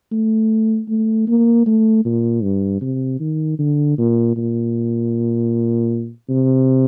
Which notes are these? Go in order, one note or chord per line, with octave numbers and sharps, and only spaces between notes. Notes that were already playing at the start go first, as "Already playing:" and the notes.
A3
A3
A#3
A3
A#2
G2
C3
D#3
D3
A#2
A#2
C3